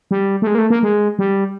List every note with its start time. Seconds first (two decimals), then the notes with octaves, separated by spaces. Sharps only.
0.11 G3
0.42 A3
0.47 G#3
0.55 A#3
0.58 A3
0.70 A#3
0.83 G#3
1.19 G3